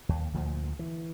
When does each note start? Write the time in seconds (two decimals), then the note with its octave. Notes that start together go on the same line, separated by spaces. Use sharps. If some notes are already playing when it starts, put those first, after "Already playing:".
0.09 D#2
0.34 D2 A#2 F3
0.79 E3